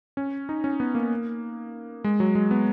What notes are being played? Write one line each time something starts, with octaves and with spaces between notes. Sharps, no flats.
C#4
D#4
C#4
B3
A#3
G#3
F#3
G#3
B3